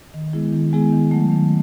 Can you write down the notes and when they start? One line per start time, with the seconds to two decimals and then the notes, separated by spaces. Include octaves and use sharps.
0.14 D#3
0.33 G#3 B3 E4 G#4
0.52 D#3
0.73 G#3 B3 E4 G#4
0.93 D#3
1.11 F#3 A3
1.32 D#3